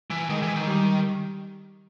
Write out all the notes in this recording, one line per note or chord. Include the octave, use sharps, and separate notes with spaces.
E3
D#3 G#3
E3
D#3
G3